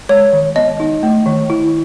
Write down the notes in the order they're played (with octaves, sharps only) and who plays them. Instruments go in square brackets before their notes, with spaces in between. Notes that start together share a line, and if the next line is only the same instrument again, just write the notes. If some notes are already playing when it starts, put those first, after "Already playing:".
[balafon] G#3 [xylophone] C#5
[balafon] D#3
[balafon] B3 [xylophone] D#5
[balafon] D#4
A3
D#3
E4